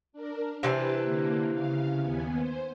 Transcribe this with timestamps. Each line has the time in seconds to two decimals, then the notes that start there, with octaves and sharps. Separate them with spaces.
0.13 D4 A#4
0.63 C3 E3 D4 G4 B4 A5
1.03 D3 A#3
1.51 C#3 F5
2.02 D#2 B3 G#5
2.38 C5